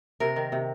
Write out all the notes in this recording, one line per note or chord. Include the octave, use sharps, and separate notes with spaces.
C3 A#4
D#3
C3